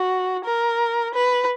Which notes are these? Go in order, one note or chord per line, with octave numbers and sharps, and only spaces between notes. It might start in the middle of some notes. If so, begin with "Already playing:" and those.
Already playing: F#4
A#4
B4